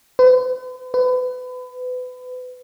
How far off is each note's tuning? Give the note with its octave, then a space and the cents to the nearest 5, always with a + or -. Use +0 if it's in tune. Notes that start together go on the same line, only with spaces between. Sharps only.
B4 +45
B4 +30